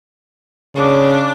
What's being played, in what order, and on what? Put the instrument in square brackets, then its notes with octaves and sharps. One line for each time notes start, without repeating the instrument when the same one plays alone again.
[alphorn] C#3 [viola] D4 D6